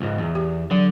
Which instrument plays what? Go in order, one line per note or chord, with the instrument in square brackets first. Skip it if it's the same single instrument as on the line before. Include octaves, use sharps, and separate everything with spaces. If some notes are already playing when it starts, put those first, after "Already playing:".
[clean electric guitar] C#2 G#2
E2
[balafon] G4
[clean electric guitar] D3 [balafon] F#3